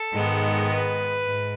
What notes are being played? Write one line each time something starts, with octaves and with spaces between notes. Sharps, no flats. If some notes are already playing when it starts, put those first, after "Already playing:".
Already playing: A4
G#2 D#3 G#3 B3
B4
G#2